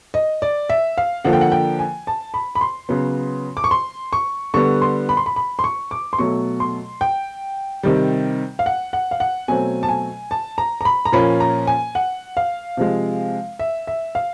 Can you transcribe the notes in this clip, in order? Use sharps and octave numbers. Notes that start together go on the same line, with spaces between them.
D#5
D5
E5
F5
D3 F3 A#3 F#5
G5
F#5
G5
G#5
A5
B5
B5
C6
C#3 F#3 B3
D6
C#6
C6
C#6
D3 G3 B3 C#6
C6
B5
C6
B5
B5
C6
C#6
D6
C6
B2 F#3 A3 C#6
C6
G5
C3 D#3 G3
F5
F#5
F#5
F5
F#5
B2 F#3 A3 C4 G#5
A5
G#5
A5
A#5
A#5
B5
A#5
A#2 F3 A#3 C#4 B5
A#5
G#5
F#5
F5
C3 F3 G#3
E5
E5
F5